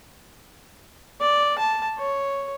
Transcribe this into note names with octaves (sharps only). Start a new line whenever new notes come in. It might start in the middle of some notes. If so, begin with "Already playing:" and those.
D5
A5
C#5